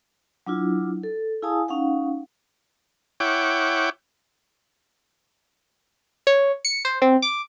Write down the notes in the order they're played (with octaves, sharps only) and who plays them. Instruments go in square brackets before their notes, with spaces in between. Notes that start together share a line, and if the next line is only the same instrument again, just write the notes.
[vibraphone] F#3 D4 E4 F4
A4
E4 G#4 F5 G#5 A5 D#6
C#4 D#4 F5 F#5
[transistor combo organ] E4 C#5 F#5 G5 D6
[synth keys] C#5
C#7
C5
C4
D6